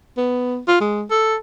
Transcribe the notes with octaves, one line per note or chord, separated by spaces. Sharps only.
B3
F4
G#3
A4